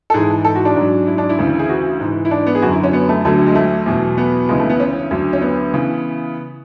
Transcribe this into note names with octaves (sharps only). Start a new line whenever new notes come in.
A4
G#2 E3 G#4
A4
F#4
D4
G#2 F#3
E4
D4
E4
D2 C#3 E3
G#4
F#4
G#2 E3
E4
D4
B3
G#4
F#2 D3 F#3 F#4
E4
C#4
B3
A3
D2 D3 F#3 A3
G#3
A3
E2 B2 F#3
B3
D2 C#3 E3 G#3
A3
B3
C#4
D2 D3 F#3
C#4
B3
C#3 E3